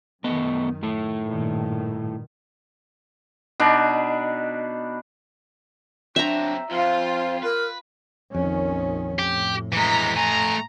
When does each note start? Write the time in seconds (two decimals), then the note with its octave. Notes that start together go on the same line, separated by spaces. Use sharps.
0.24 F#2 D#3 A3 B3 D#5
0.83 A2 A3
1.27 G2 A#2 D#3
3.60 B2 D4 D#4
6.16 F#3 C4 D4 E5 A#5
6.71 F2 F4 C5
7.43 A#4 B4
8.35 A#1 F2 D#3 C#4
9.19 A2 G4
9.72 E3 G#3 A#5 B6
10.16 A3 G#5 A#5